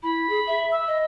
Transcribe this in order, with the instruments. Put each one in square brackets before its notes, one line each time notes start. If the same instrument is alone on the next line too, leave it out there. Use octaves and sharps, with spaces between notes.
[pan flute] E4 [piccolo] B5
[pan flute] G#4
E5
[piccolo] E6
[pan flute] D#5